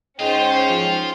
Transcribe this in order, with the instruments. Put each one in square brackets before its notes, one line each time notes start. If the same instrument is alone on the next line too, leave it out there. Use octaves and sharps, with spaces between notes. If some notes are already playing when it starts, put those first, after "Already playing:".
[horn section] G#2 G#3 G5 [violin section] C#4 C5 [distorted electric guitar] F4 [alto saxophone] D#5
[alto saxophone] F3